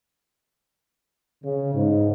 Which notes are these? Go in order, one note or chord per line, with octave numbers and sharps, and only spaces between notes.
C#3
G#2